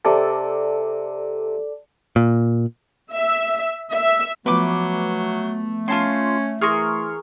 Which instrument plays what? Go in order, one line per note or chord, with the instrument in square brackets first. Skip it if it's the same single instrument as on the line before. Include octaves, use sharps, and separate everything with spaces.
[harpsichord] C3 [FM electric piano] A4 D5
[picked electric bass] A#2
[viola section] E5
E5
[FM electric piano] F3 B3 [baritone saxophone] F#3 [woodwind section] A3 [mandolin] B4 D6
[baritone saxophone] C#4 [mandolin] F4 A5 C6
[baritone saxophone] E3 [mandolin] G#4 A#4 [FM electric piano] C6 C#6 F6